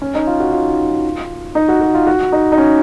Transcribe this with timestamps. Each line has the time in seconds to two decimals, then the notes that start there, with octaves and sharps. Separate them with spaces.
0.02 C#4
0.15 D#4
0.27 F4
0.40 F#4
0.53 F4
1.55 D#4
1.68 F#4
1.81 F#4
1.94 F4
2.07 F#4
2.32 D#4
2.52 D#4
2.58 C#4